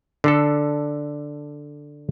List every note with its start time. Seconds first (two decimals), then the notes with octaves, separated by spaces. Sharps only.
0.24 D3 D4 A4